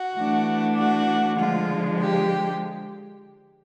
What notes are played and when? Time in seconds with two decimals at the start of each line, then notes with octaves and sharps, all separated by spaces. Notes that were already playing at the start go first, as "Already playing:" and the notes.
Already playing: F#4
0.16 E3 A3 D4
0.77 F#4
1.38 D3 F3 G#3 F4
1.98 G4